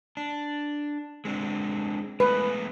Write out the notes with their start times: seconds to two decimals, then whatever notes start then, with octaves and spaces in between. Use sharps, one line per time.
0.17 D4
1.25 G#3 C4 D4
2.20 G#3 A3 B3 B4